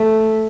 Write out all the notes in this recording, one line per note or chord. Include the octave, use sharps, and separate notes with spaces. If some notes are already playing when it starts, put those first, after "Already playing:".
Already playing: A3